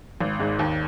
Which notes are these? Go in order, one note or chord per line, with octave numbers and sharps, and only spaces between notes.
G#1
G#2 G#3
D#2